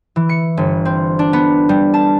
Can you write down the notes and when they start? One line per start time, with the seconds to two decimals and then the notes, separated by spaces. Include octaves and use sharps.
0.16 E3
0.29 C#7
0.57 G1
0.85 C4
1.19 D4
1.33 B3
1.69 G3
1.94 A5